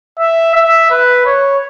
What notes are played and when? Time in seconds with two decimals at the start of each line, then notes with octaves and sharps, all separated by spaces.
0.19 E5
0.54 E5
0.91 B4
1.26 C#5